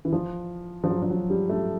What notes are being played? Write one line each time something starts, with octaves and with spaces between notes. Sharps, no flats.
E3
F3
F3
F#3
F3
F#3
G3
A3